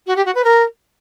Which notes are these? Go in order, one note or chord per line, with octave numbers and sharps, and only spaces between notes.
F#4
G4
F#4
B4
A#4